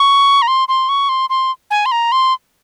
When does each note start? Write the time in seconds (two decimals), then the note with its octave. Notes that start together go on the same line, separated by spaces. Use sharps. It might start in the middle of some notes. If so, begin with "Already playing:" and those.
Already playing: C#6
0.42 A#5
0.48 C6
0.68 C6
0.89 C#6
1.09 C6
1.30 C6
1.71 G#5
1.86 C6
1.92 A#5
2.12 C6